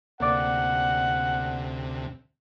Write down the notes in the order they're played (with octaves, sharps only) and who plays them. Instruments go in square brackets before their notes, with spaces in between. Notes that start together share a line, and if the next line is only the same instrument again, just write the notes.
[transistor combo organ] D2 C3 [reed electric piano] A#3 D5 [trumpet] F#5